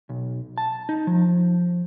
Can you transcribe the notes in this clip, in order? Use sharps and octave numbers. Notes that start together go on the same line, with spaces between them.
B1
A5
D#4
F3